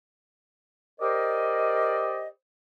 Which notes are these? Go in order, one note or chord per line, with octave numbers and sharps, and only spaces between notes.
G4 A#4 C5 D5 D#5